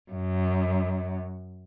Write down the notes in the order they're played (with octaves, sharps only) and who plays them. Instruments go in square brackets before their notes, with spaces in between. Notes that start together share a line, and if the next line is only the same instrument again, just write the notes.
[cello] F#2